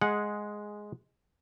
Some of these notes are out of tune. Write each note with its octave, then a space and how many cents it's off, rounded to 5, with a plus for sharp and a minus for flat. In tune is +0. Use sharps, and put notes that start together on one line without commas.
G#3 +0 G#4 +0 F#5 -15